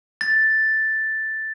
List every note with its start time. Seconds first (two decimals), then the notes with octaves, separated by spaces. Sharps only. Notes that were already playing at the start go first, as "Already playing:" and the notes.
0.21 A6